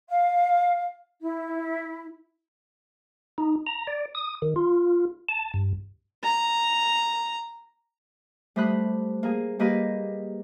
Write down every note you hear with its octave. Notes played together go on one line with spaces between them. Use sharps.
F5
E4
D#4
A#5
D5
D#6
D#3
F4
A5
G2
A#5
G3 A3 C5 B5 D#6 F#6
A#3 G#4
G3 A#3 G4 G#4 B4 D#5